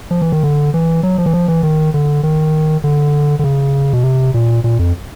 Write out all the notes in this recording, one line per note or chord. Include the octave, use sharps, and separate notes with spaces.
F3
E3
D#3
D3
E3
F#3
F3
E3
F3
E3
D#3
D3
D#3
D3
D3
C#3
B2
C3
A#2
A#2
F2